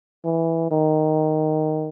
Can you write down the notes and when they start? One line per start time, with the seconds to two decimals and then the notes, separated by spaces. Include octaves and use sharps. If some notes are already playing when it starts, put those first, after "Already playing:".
0.25 E3
0.71 D#3